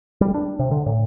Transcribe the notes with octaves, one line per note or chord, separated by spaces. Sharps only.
G3
D4
C3
D3
A2